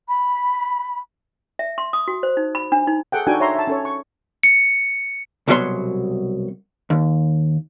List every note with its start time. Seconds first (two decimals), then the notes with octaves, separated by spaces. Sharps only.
0.08 B5
1.59 E5
1.78 C6
1.93 D#6
2.08 F#4
2.23 C5
2.37 D#4
2.55 B5
2.72 D4
2.88 D#4
3.12 G#4 A4 F#5 G5
3.27 D4 D#4 F#4 A4 G5 G#5
3.40 C#5 E5 A#5 C6
3.55 E5 A5
3.67 C#4 A4 C#5
3.85 C#6
4.43 C#7
5.48 C2 B2 F#3 A4 C#5 C6
6.90 D#2